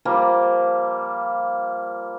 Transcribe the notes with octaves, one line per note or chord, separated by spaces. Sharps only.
F3 G3 A#3